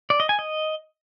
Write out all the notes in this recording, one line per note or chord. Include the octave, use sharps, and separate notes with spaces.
D5
D#5
G#5
D#5